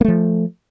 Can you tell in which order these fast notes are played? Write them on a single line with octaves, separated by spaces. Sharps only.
A#3 A3 F3